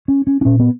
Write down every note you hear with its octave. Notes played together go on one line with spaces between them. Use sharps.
C#4
C#4
D4
A#2 C#4
B3